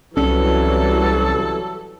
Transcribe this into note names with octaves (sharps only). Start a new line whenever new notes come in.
C2 E3 F#3 G3 C#4 A4